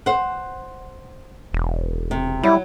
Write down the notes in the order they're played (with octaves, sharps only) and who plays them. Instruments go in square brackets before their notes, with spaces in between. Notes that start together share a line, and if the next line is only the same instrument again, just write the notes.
[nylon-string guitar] C5 F#5
[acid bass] E1
[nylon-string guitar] C3
[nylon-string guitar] F#3 [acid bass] G3 [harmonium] E4